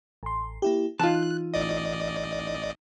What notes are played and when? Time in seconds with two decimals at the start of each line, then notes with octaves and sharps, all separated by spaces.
0.23 A1 C6
0.62 A#3 E4 G4
0.99 E3 D#4 F4 A5 F#6
1.54 A1 D5 D#5